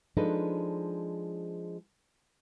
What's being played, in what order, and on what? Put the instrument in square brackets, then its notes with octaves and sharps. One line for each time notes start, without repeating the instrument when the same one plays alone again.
[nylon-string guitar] F3 G#3 D4 D#4 A4 B4